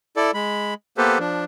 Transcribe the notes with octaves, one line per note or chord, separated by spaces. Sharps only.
E4 A4 D5
G#3 B5
A#3 B3 G4 A4 B4 C5
F3 D4